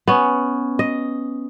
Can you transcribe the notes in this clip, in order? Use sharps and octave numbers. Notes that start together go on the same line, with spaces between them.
B3 C#4
D#5